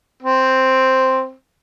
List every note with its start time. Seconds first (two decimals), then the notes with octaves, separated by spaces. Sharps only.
0.23 C4